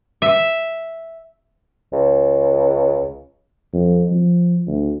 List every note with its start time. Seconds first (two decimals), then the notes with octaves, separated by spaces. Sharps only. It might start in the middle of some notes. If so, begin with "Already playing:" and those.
0.22 E5
1.92 C#2
3.73 F2
4.11 F3
4.67 D2